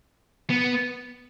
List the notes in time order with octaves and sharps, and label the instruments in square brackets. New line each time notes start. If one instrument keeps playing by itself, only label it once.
[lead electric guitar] B3